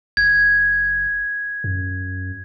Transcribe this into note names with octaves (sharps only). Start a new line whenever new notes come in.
F#1 G#6
F#2